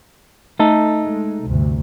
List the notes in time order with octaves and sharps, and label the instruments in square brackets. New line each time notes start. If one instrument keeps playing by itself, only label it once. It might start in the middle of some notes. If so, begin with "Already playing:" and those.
[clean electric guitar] A3 D#4 A4
[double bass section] G#3
D2 G2 C3